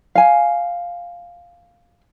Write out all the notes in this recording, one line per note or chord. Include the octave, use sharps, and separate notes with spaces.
F5 G#5